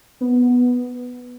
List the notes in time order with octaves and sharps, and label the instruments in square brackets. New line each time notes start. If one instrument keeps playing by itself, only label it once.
[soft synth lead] B3